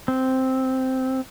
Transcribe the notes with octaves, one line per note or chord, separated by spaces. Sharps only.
C4